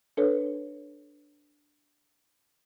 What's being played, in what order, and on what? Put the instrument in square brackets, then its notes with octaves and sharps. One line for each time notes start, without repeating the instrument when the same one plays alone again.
[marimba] D4 A4 B4 C#5